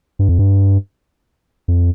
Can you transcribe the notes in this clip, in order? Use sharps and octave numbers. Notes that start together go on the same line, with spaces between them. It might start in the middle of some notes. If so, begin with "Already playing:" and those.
G2
F2
G2
F2